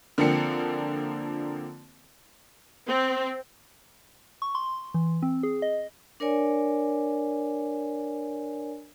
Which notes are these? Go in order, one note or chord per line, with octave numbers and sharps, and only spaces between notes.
D3 F3 A#3 C4 C#7
C4
C#6
C6
E3
C4
G#4
D#5
D4 A#4 C#5 D5 G#5